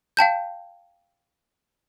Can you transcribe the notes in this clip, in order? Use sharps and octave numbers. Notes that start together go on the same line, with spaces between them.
F5 G5 A5 G6